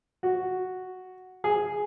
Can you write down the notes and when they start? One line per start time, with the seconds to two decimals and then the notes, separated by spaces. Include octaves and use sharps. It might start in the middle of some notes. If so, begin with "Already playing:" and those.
0.23 F#4
1.44 G#4